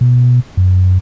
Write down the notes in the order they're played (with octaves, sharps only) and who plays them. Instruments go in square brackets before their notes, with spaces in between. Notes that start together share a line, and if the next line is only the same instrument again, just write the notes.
[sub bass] B2
F#2